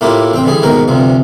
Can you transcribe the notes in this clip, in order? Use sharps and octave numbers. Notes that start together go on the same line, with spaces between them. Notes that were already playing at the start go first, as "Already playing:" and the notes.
A2 A#3 E4 F4 G4
A1 C4 G5
D3 E3 G3 G#4
D#2 G#2 B2 F#4 A#4 G5
D2 G2 C3 F3